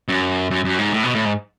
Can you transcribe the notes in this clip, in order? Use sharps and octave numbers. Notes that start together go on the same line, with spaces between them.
F#2
F#2
F#2
G#2
A2
B2
A2
G#2